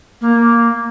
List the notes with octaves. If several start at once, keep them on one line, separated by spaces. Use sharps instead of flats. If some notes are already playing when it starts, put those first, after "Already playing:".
A#3